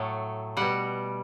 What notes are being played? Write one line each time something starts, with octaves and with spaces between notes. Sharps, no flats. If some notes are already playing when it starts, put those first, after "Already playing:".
Already playing: A2 F#3 A3
B2 G3 F#5